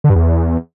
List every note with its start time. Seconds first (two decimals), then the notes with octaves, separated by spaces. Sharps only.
0.04 D3
0.10 G2
0.15 E2